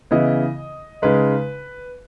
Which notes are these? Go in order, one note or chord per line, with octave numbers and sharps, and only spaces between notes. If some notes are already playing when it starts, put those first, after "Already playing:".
C#3 E3 B3 E4 D#5
C#3 G#3 D#4 B4